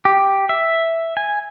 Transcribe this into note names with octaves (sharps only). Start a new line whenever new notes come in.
G4
E5
G#5